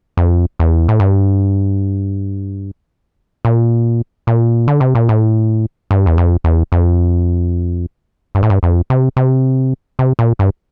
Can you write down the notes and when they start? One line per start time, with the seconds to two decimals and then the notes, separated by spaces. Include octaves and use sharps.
0.17 F2
0.59 E2
0.88 A2
1.00 G2
3.45 A#2
4.27 A#2
4.68 D3
4.80 C3
4.95 A#2
5.09 A2
5.91 G2
6.06 E2
6.18 F2
6.44 E2
6.72 F2
8.35 G2
8.43 A2
8.50 G2
8.63 F2
8.90 C3
9.17 C3
9.99 C3
10.19 A#2
10.39 G2